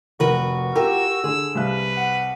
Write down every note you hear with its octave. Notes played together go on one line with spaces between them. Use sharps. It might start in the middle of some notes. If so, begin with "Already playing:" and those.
F1 F#4 A#4 B4
F4 G4 A#4 E6
D3 G#4
C2 B4 F5 F#6
F#5